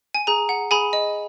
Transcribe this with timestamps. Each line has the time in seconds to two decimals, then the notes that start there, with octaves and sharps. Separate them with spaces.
0.15 G#5
0.27 G#4 A#5
0.49 F#5
0.71 G#4 G#5 B5
0.93 D#5